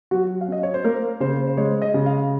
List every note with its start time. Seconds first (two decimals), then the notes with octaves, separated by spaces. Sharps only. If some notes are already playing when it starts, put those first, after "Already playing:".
0.11 F#3 F#4
0.41 F5
0.48 C#4 D#5
0.63 C#5
0.74 C5
0.84 A#3 A#4
1.20 C#3 C5
1.47 C5
1.57 G#3 C#5
1.82 D#5
1.94 C#3
2.06 F5